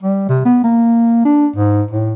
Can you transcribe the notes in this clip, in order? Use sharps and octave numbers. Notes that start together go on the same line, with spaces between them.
G3
C3
B3
A#3
D4
G#2
A2